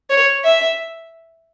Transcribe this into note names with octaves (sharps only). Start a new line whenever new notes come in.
C#5
E5